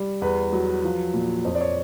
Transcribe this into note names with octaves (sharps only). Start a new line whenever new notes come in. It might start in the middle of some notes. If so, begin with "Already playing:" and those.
Already playing: G3
E2 B4
F#3
F3
A#2
F2 C5
D5
C#5